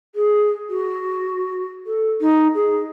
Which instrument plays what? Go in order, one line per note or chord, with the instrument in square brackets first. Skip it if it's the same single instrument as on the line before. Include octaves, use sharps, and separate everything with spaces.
[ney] G#4
F#4
A4
D#4
G#4